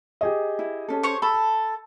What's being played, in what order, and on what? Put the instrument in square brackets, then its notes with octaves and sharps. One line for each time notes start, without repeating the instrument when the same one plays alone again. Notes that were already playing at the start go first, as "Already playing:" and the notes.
[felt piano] G4 G#4 D#5
[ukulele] E4
C#4 A4
[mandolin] C5 C#5 C#6
[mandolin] A4 [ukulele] B5